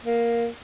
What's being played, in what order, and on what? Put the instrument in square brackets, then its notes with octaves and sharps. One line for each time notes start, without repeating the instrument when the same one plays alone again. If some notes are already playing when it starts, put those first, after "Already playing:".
[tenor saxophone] A#3